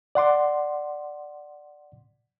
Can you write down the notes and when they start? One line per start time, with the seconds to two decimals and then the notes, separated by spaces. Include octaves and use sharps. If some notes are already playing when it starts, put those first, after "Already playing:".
0.15 D5 F#5 C6 D6